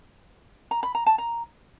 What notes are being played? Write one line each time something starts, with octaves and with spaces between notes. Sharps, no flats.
A#5
B5
A#5
A5
A#5